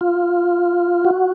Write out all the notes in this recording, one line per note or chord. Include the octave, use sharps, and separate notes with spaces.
F4
F#4